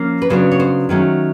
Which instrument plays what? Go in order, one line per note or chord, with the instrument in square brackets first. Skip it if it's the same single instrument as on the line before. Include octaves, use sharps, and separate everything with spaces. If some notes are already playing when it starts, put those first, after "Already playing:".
Already playing: [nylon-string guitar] F3 A#3 C#4
B4
C#3 F#3 B3 D4 C5
C#5
C5
D#3 F#3 A3 C#4